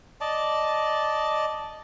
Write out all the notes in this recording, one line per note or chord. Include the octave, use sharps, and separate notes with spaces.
D5 D#5 A5